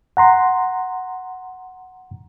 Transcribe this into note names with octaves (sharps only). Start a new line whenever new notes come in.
F#5 A#5 C6